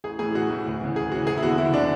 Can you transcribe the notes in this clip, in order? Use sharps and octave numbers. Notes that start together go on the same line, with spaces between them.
A1 G#4
A2 E3 G#4
A1 F#4
A2 E3
D2
C#3 E3
D2 G#4
C#3 E3 F#4
F#1 G#4
E4
E2 D3 F#4
F#1 E4
D3 D4